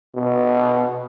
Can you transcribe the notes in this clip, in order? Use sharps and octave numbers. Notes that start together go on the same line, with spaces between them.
B2